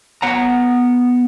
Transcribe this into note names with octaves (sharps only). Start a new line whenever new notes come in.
B3 F#5 A#5